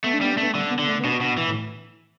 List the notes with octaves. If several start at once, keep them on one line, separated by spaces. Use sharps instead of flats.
A3 B3
D4
G3 B3
A3 D4
B3
D3 G3
B3
D3
A3
B3
B2 D4
B2
E3
A2